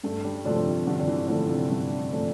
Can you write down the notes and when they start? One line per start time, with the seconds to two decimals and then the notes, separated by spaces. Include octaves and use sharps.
0.04 G2 A3
0.24 G3
0.45 C3 F3 A3 D4
0.66 C3
0.87 G2 D3
1.00 D3
1.08 E3
1.28 D3 F3 A3 D4
1.49 C3
1.70 G2
2.11 F3 A3 D4